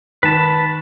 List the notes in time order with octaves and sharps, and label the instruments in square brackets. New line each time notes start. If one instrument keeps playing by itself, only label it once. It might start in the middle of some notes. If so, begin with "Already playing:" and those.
[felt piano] D#3 [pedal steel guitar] B4 A5